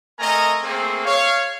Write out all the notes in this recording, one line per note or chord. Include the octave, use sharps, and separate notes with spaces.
A3 C4 A#4 D#5 G#5 A#5
A3 A#3 C4 G#4
C#5 F5